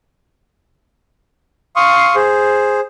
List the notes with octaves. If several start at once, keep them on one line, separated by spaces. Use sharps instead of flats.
F5 C6 C#6 D#6
G#4 C5